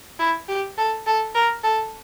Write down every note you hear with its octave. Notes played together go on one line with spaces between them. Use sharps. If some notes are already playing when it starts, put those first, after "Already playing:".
E4
G4
A4
A4
A#4
A4